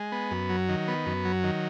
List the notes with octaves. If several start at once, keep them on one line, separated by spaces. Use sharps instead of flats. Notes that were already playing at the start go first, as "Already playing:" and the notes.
Already playing: G#3
B3
F#2
F#3
D#3
B3
F#2
F#3
D#3